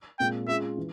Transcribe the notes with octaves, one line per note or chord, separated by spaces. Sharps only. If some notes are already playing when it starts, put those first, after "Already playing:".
A#2 G#3 C4 G5
G#3 C#4 F4 G#4 E5
E3